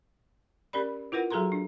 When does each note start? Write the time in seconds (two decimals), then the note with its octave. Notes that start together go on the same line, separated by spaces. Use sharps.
0.73 C#4 G4 A#4 D5 B5
1.12 E4 F4 A#4 B4 F#5
1.31 F#3 F#4 G#4 A4 A#5 C6
1.52 D4